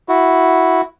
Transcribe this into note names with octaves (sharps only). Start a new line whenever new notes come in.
E4 F#4